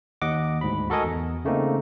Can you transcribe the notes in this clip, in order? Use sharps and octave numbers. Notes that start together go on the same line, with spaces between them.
D#2 D#5 F#5 D6
D2 G#2 B5
F#4 A4 A#4 D#5 G#5
E2
C#3 A3 A#3 C4 D#4